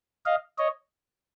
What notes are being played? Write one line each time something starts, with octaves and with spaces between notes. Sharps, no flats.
D#5 F5
C#5 D#5